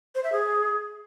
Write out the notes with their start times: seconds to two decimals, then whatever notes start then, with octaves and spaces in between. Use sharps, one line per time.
0.15 C5
0.24 E5
0.32 G#4